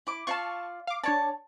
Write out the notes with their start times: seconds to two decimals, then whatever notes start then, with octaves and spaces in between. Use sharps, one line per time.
0.07 E4 D6
0.27 F4 D5 F5 A5 C#6
0.87 F5 D6
1.03 D4 C#5 D5 A5